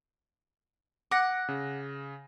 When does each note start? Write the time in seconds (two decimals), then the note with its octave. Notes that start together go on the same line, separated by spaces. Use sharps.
1.11 F#5 D6 A#6
1.49 C#3